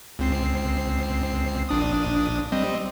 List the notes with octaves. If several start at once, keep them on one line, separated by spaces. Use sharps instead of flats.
C#2 C4 C7
A#1 D4 D#6
G3 C4 D#5